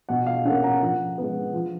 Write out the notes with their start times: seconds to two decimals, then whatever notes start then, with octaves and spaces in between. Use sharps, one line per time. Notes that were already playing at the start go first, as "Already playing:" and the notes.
0.09 B2 F#5
0.26 F5
0.45 C#4 F#5
0.50 A#3
0.63 F#5 A#5
0.81 F3 F#5
1.18 G#3 B3
1.53 F3